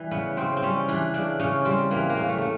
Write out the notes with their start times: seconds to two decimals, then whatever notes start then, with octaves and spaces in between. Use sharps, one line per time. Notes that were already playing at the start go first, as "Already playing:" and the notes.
Already playing: E3 G3
0.11 C#3 B3
0.37 C#3 C4
0.57 C4
0.63 G3 C#4
0.88 E3 D4
1.14 C#3 D4
1.40 C#3 C#4
1.65 G3 C4
1.91 E3 A#3
2.10 A#3
2.17 C#3
2.29 A3
2.42 C#3